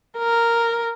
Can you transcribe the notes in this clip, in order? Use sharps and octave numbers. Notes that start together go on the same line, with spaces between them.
A#4